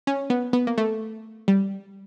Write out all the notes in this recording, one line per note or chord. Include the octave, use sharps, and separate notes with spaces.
C#4
B3
B3
A#3
A3
G3